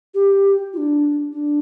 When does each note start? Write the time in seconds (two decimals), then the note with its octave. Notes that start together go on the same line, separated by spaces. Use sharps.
0.14 G4
0.73 F4
0.77 D4
1.33 D4